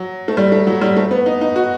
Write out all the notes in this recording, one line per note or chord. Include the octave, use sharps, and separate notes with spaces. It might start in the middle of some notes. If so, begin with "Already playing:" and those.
Already playing: F#3
A3
G3
A3
F#3
G3
A3
B3
D#4
D#4
F#4